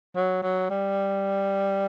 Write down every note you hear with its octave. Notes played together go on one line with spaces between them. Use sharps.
F#3
F#3
G3